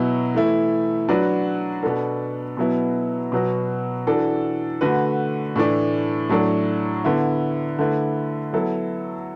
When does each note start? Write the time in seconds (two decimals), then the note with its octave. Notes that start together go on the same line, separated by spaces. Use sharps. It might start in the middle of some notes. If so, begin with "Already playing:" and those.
Already playing: B2 F#3 B3 E4
0.35 E3 A3 E4
1.09 F#3 D4 F#4 B4
1.83 B2 B3 D4 A4
2.57 B2 F#3 B3 E4
3.32 B2 F#3 B3 F#4
4.07 E3 D4 F#4 A4
4.81 D3 A3 F#4 B4
5.56 A2 E3 A3 D4
6.29 A2 F#3 D4 A4
7.05 D3 B3 E4
7.79 D3 A3 E4 B4
8.53 F#3 B3 E4 A4